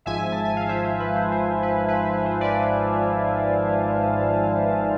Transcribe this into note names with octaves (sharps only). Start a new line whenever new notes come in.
G#1 G#2 F3 E5 G#5
A5
G#5
F5
C5 E5
C5
B4
C5
C5
B4
B4
C5
B4
C5
B4 D5